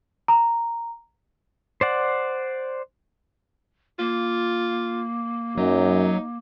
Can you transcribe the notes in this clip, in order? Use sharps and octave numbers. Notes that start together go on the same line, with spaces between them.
A#5
C5 D5 F#5
A#3 F4
F#2 F#3 D#4